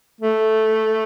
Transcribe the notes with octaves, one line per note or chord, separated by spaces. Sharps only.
A3